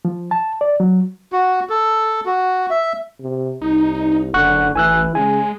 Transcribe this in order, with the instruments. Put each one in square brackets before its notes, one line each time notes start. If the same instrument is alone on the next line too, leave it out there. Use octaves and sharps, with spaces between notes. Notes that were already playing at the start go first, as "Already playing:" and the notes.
[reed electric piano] F3
A5
D5
F#3
[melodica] F#4
A4
F#4
E5
[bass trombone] C3
[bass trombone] C2 [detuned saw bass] D#4
[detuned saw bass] F#1 [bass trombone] D3 [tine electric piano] F#5 C#6 F#6
[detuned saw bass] A1 [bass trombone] E3 [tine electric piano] G#5 E6 F#6
[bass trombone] C#3 [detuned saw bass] G#3 [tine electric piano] G#5